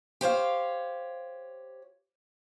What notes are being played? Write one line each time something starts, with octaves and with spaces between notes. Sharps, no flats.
G4 C5 C#5 F5